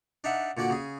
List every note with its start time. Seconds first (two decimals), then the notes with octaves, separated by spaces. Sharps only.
0.24 D4 D#4 E5 F#5
0.57 A#2 D3 F#4 D5
0.70 C#3 G#4